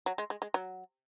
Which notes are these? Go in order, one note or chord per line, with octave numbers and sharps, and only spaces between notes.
F#3
G#3
G#3
G#3
F#3